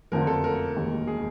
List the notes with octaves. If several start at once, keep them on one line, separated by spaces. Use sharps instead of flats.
F#1 F2 D3 F3 A#4
A4
A#4
E1 D#2 D#3 G#3
G#4